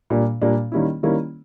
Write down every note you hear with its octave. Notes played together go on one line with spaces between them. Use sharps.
A#2 G3 A#3 D4
A#2 G3 A#3 D4
D#3 G3 A#3 C#4 E4
D#3 G3 A#3 C#4 E4